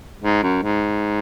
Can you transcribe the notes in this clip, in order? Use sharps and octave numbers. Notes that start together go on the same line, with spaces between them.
G#2
F#2
G#2